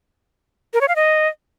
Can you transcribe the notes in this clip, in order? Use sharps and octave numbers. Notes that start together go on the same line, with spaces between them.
A#4
C#5
F5
D#5